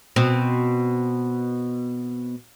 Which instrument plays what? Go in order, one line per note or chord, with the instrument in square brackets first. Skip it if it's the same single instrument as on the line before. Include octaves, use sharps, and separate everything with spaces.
[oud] B2 C4